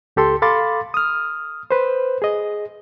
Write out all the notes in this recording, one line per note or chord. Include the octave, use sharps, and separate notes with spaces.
C#2 G4 A4 C6
A4 F5 B5 C6 D6 A6
D#6 F6
B4 C5
G#4 D#5